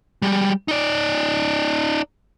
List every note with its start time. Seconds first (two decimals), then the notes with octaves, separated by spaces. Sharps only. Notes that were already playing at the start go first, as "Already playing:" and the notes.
0.22 G3 G#3
0.68 D#4 D5